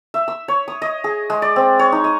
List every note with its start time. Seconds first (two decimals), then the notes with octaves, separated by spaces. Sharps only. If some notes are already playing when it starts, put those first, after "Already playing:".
0.14 E5
0.28 E6
0.48 C#5
0.68 D#6
0.82 D#5
1.04 G#4
1.30 G#3
1.42 D5
1.56 C4
1.79 C#5
1.92 D#4
2.04 D#5